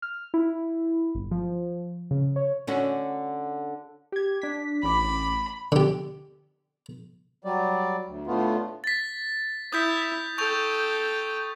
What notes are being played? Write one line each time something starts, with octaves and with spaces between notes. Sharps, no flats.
F6
E4
G1
F3
C#3
C#5
D3 C#4 F#4
G4 G#6
D4 B6
A1 B5 D6
D3 G4
F#3 G3 D5
D2
A2 D3 A3 B3 F4
A6 B6
E4 D#6 G6 B6
A4 G5 C#6 G6 F7